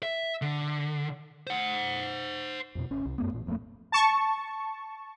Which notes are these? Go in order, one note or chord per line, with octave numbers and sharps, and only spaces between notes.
E5
D3
C5 F#5
F2 G#2 B2
G#1 C#4
C2
F#2 A3 B3
A1 A#2
D#1 F2 A3 A#3
A5 C#6